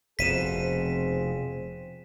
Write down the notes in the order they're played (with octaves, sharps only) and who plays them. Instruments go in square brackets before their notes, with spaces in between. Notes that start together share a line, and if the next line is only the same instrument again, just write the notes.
[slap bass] F1 B2 [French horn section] F3 C4 G#4 [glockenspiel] B6 D#7 E7